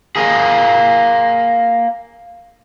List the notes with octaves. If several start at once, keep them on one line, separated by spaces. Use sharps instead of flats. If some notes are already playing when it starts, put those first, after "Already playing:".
A#3 G#4